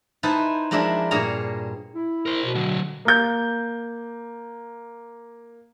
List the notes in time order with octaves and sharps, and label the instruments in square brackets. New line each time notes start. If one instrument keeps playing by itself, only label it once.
[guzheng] D#4 E4 B4 C5 A5
F3 G#3 D4 E4 A#4 E5
G2 A#2 G#4 C#5 F5 A#5
[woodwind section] E4
[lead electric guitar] A#4 C5
[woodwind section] B2
[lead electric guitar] D3 F#3
[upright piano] A#3 G6